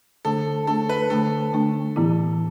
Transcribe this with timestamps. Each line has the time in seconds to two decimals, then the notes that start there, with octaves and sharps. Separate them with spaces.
0.25 D3 A3 D4 A4
0.67 D3 A3 D4 A4
0.89 B4
1.10 D3 A3 D4 A4
1.53 D3 A3 D4
1.96 A2 E3 B3 E4